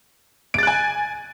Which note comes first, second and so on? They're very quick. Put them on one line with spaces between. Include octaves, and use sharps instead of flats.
D7 A6 F#6 G#5